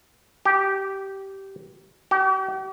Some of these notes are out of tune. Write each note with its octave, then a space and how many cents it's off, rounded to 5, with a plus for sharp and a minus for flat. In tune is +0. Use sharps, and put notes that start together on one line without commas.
G4 -15
G4 -45